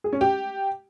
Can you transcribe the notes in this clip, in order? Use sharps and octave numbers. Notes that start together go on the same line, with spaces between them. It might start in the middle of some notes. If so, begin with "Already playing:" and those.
G#4
C#4
G4